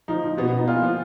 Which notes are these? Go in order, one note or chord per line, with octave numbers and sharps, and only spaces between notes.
F3 D#4
F3
B2 B3
B3
B2 D#4
A#2 F4
F3